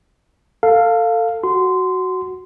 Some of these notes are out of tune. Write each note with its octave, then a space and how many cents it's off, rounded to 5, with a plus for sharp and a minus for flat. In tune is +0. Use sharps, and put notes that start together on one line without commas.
A4 +25 F5 +0
F#4 +5 C6 -15